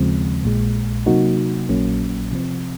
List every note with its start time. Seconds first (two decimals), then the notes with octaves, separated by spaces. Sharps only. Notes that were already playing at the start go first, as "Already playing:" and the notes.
Already playing: D#2 C#3 F3 G#3 C4
0.44 A#1 A#2 G#3
1.06 C3 F#3 A#3 D#4 F#4
1.69 A#1 A#2 F#3 A#3 C#4
2.32 C3 F3 C4